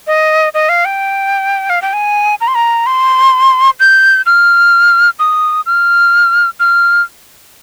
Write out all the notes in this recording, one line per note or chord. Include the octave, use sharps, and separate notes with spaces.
D#5
D#5
F5
G5
F5
G5
G#5
A#5
C6
A#5
C6
G6
F6
D#6
F6
F6